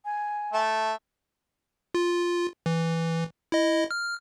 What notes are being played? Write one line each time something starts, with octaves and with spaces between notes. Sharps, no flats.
G#5
A3 A4 E5
F4
E3
E4 D#5
F6